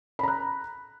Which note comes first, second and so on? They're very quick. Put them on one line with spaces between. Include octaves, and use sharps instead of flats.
B5 A#5 F#6